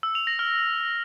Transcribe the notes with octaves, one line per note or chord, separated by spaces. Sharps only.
E6
F7
A#6
F6